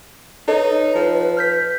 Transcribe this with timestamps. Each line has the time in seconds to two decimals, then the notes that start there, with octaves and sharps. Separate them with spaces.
0.48 D#4 A4 B4 C#5 D#5
0.95 F3
1.37 F6 G6 B6